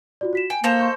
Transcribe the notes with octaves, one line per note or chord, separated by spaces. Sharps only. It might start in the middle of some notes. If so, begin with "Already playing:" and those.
F4 F#4 D5
F#4 B6 E7
G5 G#5
A#3 A4 C5 D#5 A5 E7 F7
C6 C#6 G6